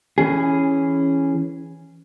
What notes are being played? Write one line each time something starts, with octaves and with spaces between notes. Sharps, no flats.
E3 C#4 G#4